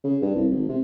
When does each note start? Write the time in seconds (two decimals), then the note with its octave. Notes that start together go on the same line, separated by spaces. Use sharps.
0.04 C#3
0.22 G2
0.35 C2
0.51 G#1
0.69 C3